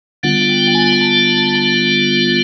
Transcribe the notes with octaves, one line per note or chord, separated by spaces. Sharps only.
D3 G3 B3 D4 F4 F#5
G5
G#5
A5